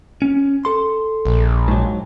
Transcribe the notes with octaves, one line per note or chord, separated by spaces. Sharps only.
C#4
A4 C6
A#1
G#2 F#3